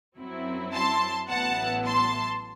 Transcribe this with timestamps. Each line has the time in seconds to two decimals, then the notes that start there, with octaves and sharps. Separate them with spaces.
0.18 F#2 F#3 C4 E4
0.73 A5 C6
1.30 A1 A2 F#3 B3 E4 F#5 A5
1.85 A5 C6